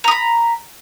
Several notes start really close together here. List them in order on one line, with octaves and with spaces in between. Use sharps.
A#5 D#6 B5